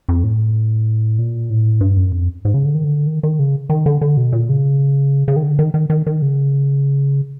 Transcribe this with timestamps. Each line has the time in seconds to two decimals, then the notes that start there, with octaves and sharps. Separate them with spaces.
0.09 F2
0.24 A2
1.19 A#2
1.50 A2
1.81 G2
1.97 F#2
2.12 F2
2.45 G#2
2.54 C#3
2.65 D3
2.75 D#3
2.84 D3
3.07 D#3
3.23 D#3
3.39 C#3
3.69 D#3
3.86 D3
4.01 D3
4.17 B2
4.32 A#2
4.49 C#3
5.28 C#3
5.36 D#3
5.43 D3
5.59 D#3
5.74 D#3
5.90 D#3
6.07 D#3
6.22 C#3